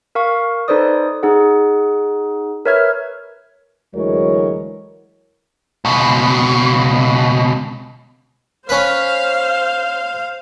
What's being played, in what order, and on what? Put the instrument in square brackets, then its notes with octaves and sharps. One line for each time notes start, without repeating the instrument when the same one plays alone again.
[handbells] A#4 F5 C#6
D#4 A4 B4 C5 D5 D#6
D#4 G#4 F#5
A#4 B4 C#5 E5 F6 G#6
[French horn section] D2 E3 F#3 G#3 A#4 C#5
[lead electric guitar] C#2 B2
[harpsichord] C#4 B4 [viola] C5 F5